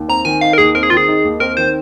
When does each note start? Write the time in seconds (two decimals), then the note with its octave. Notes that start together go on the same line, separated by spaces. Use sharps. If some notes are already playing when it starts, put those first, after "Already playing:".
Already playing: D#2
0.09 C4 A#5
0.25 D#3 G#5
0.41 D#4 F5
0.53 A#4
0.58 D#2 G#4
0.75 C4 A#4
0.83 G#4
0.90 D#3 F4
0.97 G#4
1.08 D#4
1.24 D#2
1.40 C4 A#4
1.57 D#3 C5